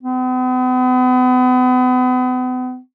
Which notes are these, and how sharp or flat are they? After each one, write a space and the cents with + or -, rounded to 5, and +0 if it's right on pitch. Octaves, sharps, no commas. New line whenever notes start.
B3 +40